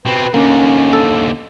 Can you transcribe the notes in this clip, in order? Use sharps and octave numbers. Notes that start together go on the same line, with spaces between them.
B2 C4 B4
D#2 D3 A#3 C#4
A4